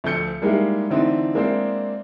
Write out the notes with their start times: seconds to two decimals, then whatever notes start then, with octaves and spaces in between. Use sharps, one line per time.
0.04 D2 F3 A4 G6 C#7
0.42 G3 G#3 A#3 D#4 E4 G4
0.91 D3 E3 A3 C4 D4 D#4
1.35 G#3 A#3 C4 D4 E4 C5